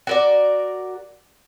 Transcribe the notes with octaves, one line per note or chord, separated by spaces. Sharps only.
F#4 A#4 D5